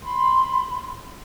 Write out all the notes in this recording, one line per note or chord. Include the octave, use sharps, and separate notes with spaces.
B5 C6